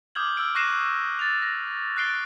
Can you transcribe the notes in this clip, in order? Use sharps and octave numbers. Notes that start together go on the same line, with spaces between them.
D6 D#6 F6 G6 G#6 F#7
E6 F6 D7
C#6 F#6 A#6 C7 D#7 E7
A6 F7
A#6
F#6 A6 C7 D7 G7